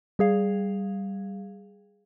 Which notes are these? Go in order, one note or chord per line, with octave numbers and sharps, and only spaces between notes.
G3 G#4 F5